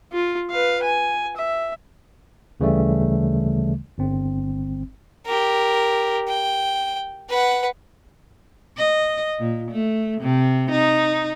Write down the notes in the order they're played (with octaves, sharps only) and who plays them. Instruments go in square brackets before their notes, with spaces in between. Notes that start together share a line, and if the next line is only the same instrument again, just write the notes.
[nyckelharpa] F4
B4 F5
G#5
E5
[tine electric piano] D2 C#3 E3 G3 A3
G1 C4
[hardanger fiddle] G4 A#4
G5
B4 F#5
[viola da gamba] D#5
A#2
A3
C3
D#4